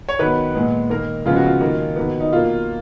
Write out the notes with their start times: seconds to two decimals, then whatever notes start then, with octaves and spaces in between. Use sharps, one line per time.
0.09 C#5
0.19 D#3 F#3 B3 B4
0.55 A#2 G#3 B3
0.90 D#3 A#3 A#4
1.25 C#3 F3 G#3 B3 F4
1.36 F#4
1.46 F4
1.61 D#3 A#3
1.96 D#3 F#3 B3
2.20 D#4
2.32 B2 A#3 F4